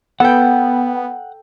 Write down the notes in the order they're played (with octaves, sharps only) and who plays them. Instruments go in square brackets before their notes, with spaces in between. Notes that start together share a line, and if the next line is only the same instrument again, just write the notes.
[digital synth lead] B3 [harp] A4 G5 [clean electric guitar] F#5